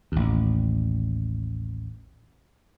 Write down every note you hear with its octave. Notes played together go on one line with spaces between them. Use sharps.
A1 D#2